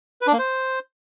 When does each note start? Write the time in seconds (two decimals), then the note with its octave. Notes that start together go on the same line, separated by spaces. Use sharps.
0.21 B4
0.27 D4
0.33 A#3
0.39 C5